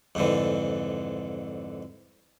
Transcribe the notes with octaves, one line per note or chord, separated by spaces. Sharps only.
F2 G#2 D3 E3